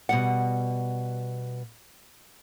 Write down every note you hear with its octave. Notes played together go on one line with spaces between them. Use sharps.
B2 G3 F#5